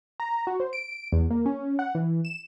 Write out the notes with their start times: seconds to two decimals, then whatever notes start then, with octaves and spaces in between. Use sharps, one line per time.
0.20 A#5
0.47 F#4
0.60 C5
0.73 D7
1.12 E2
1.31 A#3
1.46 C#4
1.79 F#5
1.95 E3
2.25 E7